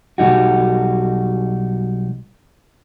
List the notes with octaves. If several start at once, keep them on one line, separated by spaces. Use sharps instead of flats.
B1 G3 D#4 F#4